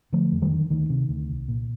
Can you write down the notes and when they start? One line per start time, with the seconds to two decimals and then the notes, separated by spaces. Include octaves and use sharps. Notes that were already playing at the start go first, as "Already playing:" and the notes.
0.12 D3 F3 A3
0.32 F2
0.42 D#3 G3
0.51 D3
0.70 D2 D#3
0.90 C3
1.09 D2
1.29 C2
1.48 A#2